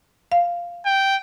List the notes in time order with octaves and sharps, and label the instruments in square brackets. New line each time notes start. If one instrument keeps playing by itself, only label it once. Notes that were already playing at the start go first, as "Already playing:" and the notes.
[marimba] F5
[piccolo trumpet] G5